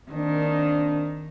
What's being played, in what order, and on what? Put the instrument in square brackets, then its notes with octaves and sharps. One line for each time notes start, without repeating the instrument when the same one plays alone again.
[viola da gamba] D#3 [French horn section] A#3 C4 D4